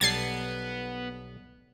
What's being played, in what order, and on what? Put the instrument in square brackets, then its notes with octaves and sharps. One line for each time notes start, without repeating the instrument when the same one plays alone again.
[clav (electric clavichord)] B1 G3 A4 [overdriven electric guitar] B3 [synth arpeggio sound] G#6 A6 C7